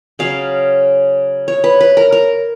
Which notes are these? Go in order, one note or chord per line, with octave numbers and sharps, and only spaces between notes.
C#3 F#3 C#4 F5
C#5
B4
B4
A#4
A#4